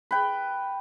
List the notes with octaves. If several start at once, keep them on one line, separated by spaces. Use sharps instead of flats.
B4 G5